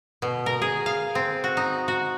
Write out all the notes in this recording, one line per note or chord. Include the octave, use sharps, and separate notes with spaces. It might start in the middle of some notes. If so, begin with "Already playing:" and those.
B2
A#4
G#4
F5
C4
F#4
D#4
F#4